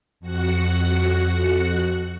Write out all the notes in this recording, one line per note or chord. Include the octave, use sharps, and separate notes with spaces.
F2 F#4 F#5 C#7